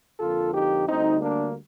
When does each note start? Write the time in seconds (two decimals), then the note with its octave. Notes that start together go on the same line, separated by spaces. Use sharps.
0.20 F2 D3 F3 A#3 F4 A4
0.54 D#4 G4
0.88 D2 D3 G3 C4 D#4
1.22 A#3 D4